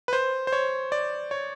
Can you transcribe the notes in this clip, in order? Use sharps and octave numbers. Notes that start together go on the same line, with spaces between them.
B4
C5
C5
C#5
D5
C#5